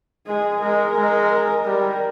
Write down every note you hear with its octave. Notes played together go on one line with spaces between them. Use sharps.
G#3 G#4
G#3 A#4
G#3
G3 A#4